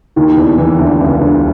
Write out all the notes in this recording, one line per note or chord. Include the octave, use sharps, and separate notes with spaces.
D#2 D#3
E2 E3
E2 E3
D2 D3
C#2 C#3
D2 D3